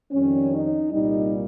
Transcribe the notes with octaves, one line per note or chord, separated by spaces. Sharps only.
F2 D#3 G3 C#4
D#4
C2 A#2 G3 D#4